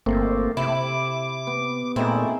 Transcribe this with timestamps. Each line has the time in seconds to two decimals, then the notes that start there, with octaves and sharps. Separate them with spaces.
0.06 G1 A3 A#3 C4
0.57 C3 E4 D6
1.47 B3
1.96 A#2 A3 C4 D#4 E4 G#4